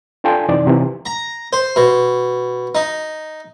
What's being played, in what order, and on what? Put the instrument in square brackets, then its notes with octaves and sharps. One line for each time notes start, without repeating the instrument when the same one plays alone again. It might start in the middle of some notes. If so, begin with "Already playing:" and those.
[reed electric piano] D4 F4 A4 G5 G#5 C6
F#2 C3 E3 D#4 D5
C3 D#3 E3 G3
[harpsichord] A#5
C5
B2
D#4